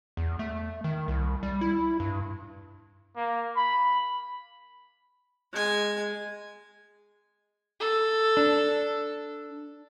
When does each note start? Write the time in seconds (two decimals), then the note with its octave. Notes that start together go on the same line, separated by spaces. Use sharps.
0.17 E2
0.39 A3
0.84 D#3
1.08 C2
1.43 G3
1.61 E4
2.00 G2
3.16 A#3
3.57 B5
5.52 G#3 G#5
7.80 A4
8.37 D4